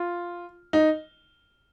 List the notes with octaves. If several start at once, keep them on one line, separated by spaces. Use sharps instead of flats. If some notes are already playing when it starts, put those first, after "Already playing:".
Already playing: F4
D#4